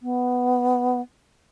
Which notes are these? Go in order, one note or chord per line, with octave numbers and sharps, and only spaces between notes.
B3